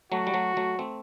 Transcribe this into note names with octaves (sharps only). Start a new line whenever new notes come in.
F#3 A3 F#4
G3
F#3 A3
F#3 A3
A3 C4